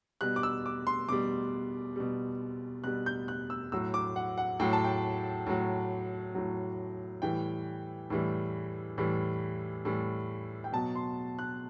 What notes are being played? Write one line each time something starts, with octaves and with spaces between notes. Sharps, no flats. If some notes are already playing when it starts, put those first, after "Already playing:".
B2 G3 F#6
D6
E6
D6
C6
B2 G3 D6
B2 G3
B2 G3 F#6
G6
F#6
E6
A2 F#3 E6
D6
F#5
F#5
A2 F#3 G5
A5
G5
A2 F#3
A2 F#3
A2 E3 G3 G5
A2 E3 G3
A2 E3 G3
A2 E3 G3
G5
B2 F#3 A5
C6
F#6